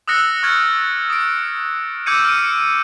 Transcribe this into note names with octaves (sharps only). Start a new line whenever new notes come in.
D#6 E6 F#6 A#6 C#7
C#6 F6 G#6 A6
D#6 D7
D6 E6 G6 G#6 C#7 D#7
F6 D7 D#7
C#7